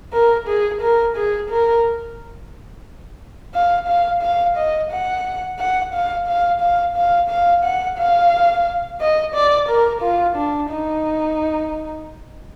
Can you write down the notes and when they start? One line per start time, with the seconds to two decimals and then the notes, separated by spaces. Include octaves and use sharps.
0.13 A#4
0.48 G#4
0.81 A#4
1.16 G#4
1.50 A#4
3.55 F5
3.88 F5
4.22 F5
4.57 D#5
4.91 F#5
5.59 F#5
5.93 F5
6.27 F5
6.61 F5
6.96 F5
7.29 F5
7.64 F#5
7.98 F5
9.00 D#5
9.35 D5
9.69 A#4
10.02 F4
10.36 D4
10.70 D#4